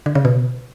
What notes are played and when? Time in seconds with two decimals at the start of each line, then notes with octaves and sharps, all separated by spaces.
0.06 D3
0.15 C#3
0.25 B2